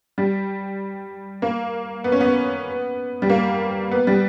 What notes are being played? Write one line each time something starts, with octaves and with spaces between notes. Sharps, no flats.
G3
A#3
B3
C#4
B3
G3
A#3
B3
G3